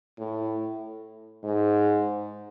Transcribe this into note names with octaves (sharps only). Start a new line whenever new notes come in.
A2
G#2